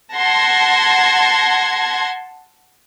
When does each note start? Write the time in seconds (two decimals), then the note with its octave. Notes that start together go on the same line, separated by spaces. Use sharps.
0.15 F#5 A5 C6 G#6 A#6